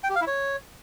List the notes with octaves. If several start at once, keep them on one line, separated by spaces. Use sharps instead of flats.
G5
G4
F5
E4
C#5